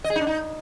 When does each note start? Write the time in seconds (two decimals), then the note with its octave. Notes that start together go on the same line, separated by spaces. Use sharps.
0.04 D#5
0.10 G#4
0.16 D#4
0.21 D4
0.27 D#4